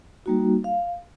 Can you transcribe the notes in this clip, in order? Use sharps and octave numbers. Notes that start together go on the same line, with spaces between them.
G3 A#3 D#4 F#4
F5